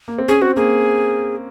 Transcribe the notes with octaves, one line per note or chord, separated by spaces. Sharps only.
A#3
C4
C#4 G#4
C4 F#4
A#3 G#4